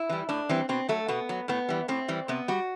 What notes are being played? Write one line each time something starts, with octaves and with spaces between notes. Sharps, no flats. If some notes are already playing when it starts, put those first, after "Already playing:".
Already playing: E4
E3 G3
A2 D4
E3 G3 C4
B2 C4
F#3 A3
B2 B3
F#3
A2 B3
E3 G3
A2 C4
E3 G3
C3 B3
G3 F#4